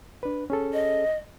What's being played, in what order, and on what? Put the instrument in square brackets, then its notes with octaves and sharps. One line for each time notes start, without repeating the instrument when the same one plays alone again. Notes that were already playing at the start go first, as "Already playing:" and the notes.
[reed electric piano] D4 B4
C#4 G#4 A4
[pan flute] D#5